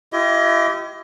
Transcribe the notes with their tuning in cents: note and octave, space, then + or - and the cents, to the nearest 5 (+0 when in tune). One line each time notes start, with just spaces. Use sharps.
E4 +40 G4 -25 D#5 +25